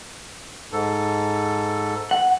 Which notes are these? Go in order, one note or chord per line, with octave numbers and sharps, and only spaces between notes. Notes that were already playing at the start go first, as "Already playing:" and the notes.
G#2 A4
F#5